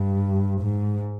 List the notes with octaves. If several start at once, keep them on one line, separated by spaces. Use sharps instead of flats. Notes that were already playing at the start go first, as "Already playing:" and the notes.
Already playing: G2
G#2